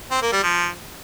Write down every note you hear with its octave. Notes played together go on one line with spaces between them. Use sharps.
C4
A#3
G3
F3